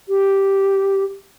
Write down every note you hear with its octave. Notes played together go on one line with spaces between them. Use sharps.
G4